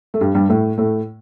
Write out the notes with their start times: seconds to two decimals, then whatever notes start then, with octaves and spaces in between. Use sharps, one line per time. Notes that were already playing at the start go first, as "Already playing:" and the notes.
0.14 A3
0.21 G2 G3
0.35 G2 G3
0.49 A2 A3
0.78 A2 A3